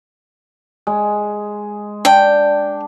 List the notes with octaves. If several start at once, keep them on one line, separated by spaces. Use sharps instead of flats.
G#3
D4 G5